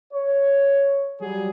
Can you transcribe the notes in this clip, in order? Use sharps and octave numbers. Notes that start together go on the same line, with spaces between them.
C#5
F#3 G3 G#4